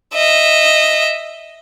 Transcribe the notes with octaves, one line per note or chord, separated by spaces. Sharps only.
D#5 E5